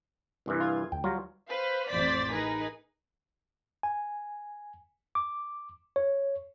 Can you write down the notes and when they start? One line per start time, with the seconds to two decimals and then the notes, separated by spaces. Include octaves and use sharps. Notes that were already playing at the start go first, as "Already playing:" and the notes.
0.46 C2 G2 E3
0.60 F4 G#6
0.92 D2 G5
1.04 F#3 G3 F4
1.49 B4 C5 F5
1.88 A1 F2 C5 D5 A6 B6
2.31 D#4 G#4 A#4 B4
3.83 G#5
5.15 D6
5.96 C#5